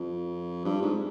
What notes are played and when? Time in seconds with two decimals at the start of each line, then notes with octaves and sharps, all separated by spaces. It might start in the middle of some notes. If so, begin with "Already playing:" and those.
Already playing: F2
0.65 G2
0.82 G#2